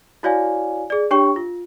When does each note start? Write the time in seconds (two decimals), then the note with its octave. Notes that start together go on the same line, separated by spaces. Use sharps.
0.23 E4 F#4 C#5 D5 F5 G#5
0.90 G#4 D5
1.11 D4 G4 C#5 G5 C#6
1.36 F4